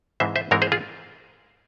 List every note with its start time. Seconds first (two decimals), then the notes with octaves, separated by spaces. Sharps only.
0.20 G#2 E3 G#3 C4 C5 E5
0.36 C5 E5
0.51 G#2 E3 G#3 C4 A#4 C#5
0.62 G#4 C5
0.72 F4 G#4